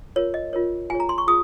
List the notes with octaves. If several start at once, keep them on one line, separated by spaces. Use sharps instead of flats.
F4 A#4 C#5
D#5
F4 A#4 C#5
F4 G#4 C#5 G#5
A#5
C6
C#6
F4 G#4 D#6